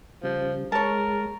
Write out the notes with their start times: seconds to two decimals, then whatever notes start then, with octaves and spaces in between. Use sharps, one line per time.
0.23 C#3 F3 G3
0.72 G#3 A#4 C#5 A5